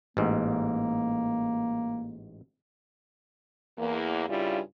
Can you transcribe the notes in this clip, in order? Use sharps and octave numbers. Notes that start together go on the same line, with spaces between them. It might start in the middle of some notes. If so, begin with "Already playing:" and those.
A1 G#2 A#3
E2 A#3
G2 C#3 G3 E4 F4 G#4